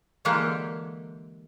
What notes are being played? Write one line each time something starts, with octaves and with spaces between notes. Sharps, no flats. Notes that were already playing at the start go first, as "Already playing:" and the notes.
D3 E3 G#3 A#3 G4 A4